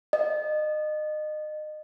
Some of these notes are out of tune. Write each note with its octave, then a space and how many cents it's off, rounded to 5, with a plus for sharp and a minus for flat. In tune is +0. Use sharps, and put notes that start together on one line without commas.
D#5 -30